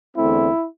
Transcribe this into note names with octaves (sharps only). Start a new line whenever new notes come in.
E2 D3 A3 C4 E4